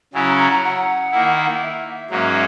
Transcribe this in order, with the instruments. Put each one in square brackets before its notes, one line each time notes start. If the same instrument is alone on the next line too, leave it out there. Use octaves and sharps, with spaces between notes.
[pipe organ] C#3 F#3 C#4 E4 [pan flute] G#5
[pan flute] A#5
A#5
A#5
F#5
[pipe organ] D#3 A#3 E4
[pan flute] E5
[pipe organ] G#2 F#3 A#3 C#4